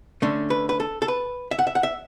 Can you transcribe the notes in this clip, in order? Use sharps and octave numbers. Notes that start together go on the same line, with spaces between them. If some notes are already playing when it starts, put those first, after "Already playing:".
D3 A3 C#4
B4
B4
A4
A4
B4
E5
F#5
E5
F#5
E5